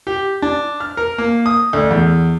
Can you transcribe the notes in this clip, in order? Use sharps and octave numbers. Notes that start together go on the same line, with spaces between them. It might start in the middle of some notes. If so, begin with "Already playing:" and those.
G4
D4
F6
A#4
A#3
D#6
D2
E2